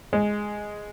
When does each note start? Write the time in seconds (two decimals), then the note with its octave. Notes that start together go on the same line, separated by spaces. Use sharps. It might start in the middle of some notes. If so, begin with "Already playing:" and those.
0.13 G#3